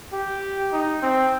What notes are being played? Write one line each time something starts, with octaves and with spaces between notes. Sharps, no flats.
G4
D#4
C4